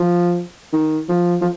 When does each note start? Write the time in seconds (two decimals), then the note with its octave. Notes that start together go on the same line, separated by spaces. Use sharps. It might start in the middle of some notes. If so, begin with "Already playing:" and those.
Already playing: F3
0.73 D#3
1.09 F3
1.41 F3